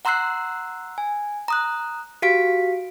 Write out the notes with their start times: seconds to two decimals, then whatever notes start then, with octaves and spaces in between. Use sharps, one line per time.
0.05 F#5 A#5 C6 E6 F#6 C7
0.98 G#5
1.48 A#5 D#6 F#6
2.22 F#4 G4 F5 B6 D7